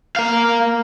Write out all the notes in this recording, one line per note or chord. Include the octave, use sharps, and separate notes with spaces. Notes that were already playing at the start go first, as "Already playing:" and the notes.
A#3 F5